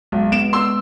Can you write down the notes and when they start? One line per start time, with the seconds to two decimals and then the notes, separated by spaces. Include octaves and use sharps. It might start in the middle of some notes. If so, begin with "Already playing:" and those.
0.12 B1 G#3
0.32 B3 D7 E7
0.53 C6 E6